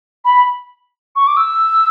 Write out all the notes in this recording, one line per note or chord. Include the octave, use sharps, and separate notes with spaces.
B5
C#6
D6
E6